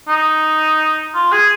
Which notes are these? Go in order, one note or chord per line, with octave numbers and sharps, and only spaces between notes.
D#4
F4
G#4